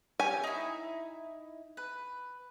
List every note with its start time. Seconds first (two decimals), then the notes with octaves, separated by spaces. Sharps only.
0.20 G4 C#5 G#5
0.44 D#4 E4
1.77 B4